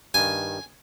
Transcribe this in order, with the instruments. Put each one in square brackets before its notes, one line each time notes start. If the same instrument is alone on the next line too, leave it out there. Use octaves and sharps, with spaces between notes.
[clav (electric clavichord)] G2 D#3 [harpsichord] G#5